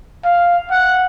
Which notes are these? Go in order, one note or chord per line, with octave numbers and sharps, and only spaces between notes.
F5
F#5